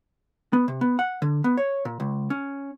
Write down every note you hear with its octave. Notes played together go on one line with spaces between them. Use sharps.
B3
C3
B3
F#5
D3
B3
C#5
A#2
C#2
C#4